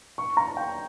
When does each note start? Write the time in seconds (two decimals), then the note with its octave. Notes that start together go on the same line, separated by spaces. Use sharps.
0.18 C#6
0.37 A#5
0.57 G5